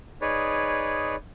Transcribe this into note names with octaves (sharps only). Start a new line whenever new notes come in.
D#4 G#4 B4 C#5 D5